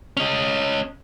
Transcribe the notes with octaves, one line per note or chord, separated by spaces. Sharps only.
C#4 D#5